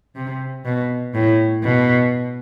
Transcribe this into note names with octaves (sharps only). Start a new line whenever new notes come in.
C3
B2
A2
B2